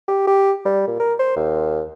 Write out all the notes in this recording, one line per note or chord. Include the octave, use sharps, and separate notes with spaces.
G4
G4
G3
A#2
A#4
C5
D#2